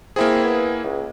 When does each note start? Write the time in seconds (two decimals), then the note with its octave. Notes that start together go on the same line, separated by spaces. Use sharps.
0.16 A#3 C4 E4 G#4
0.44 B3
0.83 C#2